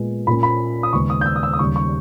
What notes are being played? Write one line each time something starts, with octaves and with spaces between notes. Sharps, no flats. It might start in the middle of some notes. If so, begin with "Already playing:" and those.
Already playing: A#2 G#3 B3
A#2 A#3 C#4 B5
B5
D#6
D#2 C#3 G#3 B3 C#6
D#6
G6
E6
D#6
E6
D#6
D#2 C#3 G3 C#6
C#6